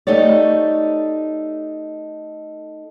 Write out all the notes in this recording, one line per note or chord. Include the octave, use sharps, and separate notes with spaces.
A3 D#4 G4 C#5 D5